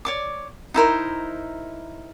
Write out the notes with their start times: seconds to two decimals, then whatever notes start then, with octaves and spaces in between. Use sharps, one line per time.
0.05 C#5 D5 D6
0.74 D#4 E4 A#4 C5